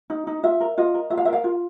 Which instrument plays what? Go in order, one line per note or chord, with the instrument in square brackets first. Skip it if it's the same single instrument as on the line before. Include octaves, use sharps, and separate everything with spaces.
[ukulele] D#4
D#4
F4 E5
A#4
F4 D#5
A#4
F4 E5
F5
A#4 E5
F5
F4